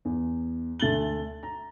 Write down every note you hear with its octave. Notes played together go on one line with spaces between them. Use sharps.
E2
D2 A3 A6 F#7 G7
A#5